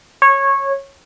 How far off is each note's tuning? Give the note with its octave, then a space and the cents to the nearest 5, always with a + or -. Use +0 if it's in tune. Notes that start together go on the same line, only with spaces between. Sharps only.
C#5 -15